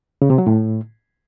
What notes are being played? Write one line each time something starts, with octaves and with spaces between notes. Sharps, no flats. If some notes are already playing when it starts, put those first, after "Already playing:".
C#3
C3
F#3
A2